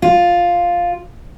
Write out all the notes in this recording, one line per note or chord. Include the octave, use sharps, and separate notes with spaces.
F4